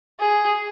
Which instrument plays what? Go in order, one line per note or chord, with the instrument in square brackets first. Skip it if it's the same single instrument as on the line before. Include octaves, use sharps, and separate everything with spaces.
[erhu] G#4